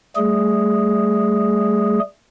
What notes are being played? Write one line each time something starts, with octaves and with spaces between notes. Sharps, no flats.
G3 A3 G#4